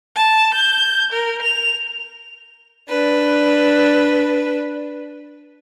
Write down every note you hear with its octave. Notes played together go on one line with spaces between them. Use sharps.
A5
G6
A#4
F7
D4 B4